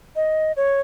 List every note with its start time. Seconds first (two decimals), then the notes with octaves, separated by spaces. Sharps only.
0.16 D#5
0.57 C#5